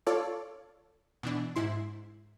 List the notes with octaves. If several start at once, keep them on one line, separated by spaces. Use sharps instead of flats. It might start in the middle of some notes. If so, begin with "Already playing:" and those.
F4 A4 C#5 D5
B2 E3 D4
G#2 E4 C6